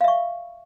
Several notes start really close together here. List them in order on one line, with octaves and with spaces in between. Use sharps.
F5 E5 C#6